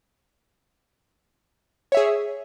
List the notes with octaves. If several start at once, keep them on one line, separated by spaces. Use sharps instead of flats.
G#4 C#5 E5